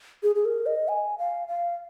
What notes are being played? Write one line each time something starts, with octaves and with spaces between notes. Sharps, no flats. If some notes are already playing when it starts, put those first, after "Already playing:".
G#4
G#4
A#4
D#5
G#5
F5
F5